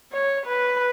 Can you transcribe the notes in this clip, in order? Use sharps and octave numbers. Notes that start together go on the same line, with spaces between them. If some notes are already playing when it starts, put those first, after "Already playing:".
C#5
B4